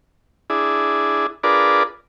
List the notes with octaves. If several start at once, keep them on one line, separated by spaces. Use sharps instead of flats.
D4 E4 G#4
D4 F4 G#4 A#4 B4 D5